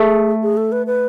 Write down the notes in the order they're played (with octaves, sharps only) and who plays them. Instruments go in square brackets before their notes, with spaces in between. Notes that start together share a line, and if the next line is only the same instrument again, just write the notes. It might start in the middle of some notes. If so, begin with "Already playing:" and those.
Already playing: [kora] A3 [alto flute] G#4
[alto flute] G#4
A4
B4
B4